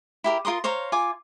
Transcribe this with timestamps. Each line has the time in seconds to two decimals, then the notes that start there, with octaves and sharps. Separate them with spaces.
0.24 E4 G4 A#4
0.45 F4 A#4 C6 D#6
0.64 C5 C#5 F5 A#5
0.92 F4 G#5 D6